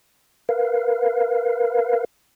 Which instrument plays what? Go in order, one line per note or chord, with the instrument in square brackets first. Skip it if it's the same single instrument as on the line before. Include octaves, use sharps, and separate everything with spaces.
[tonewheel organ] A#4 B4 F5